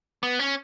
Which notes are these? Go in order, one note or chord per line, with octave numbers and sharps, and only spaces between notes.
B3
C#4